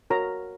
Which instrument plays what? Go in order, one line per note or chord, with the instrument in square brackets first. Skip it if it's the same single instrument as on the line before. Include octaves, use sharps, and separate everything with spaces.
[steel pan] F#4 A#4 C#5 A#5